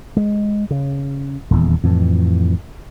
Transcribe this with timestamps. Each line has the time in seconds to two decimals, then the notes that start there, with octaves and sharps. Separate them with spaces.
0.17 G#3
0.71 C#3
1.51 D#1 E2
1.83 F2 A2 E3